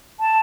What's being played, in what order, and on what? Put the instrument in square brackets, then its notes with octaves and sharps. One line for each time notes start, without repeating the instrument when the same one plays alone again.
[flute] A5